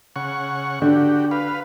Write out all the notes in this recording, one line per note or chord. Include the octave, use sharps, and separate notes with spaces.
C#3 F#5 C#6
D3 F#4 G4
B4 F5